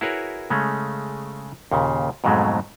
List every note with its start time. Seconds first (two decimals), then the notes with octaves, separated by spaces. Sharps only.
0.01 E4 F#4 G#4 A#4 B4 C#5
0.50 C#3 G#3 A3 C#4
1.71 D#2 A#2 C#3
2.24 F2 G#2 B2 F#3 G#3 A3